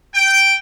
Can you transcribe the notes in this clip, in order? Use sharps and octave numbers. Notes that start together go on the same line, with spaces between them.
G5